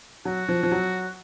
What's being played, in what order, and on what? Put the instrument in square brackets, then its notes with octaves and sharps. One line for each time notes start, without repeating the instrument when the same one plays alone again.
[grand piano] F#3 [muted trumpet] F#4
[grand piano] F3
F3
F#3